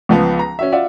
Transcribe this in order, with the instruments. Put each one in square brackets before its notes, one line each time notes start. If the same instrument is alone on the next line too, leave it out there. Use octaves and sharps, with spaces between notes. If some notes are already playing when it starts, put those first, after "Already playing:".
[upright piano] C#2 F3 B3
A#5
C#4 F#4 E5
F4 D5 E5 F#5